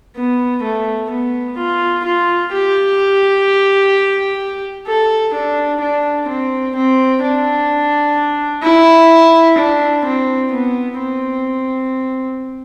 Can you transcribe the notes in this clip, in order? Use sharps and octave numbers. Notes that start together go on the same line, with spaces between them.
B3
A3
B3
F4
F4
G4
A4
D4
D4
C4
C4
D4
E4
D4
C4
B3
C4